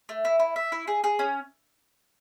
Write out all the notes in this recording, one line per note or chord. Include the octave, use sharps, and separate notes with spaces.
A3
E4
E4
E5
E4
G#4
G#4
C#4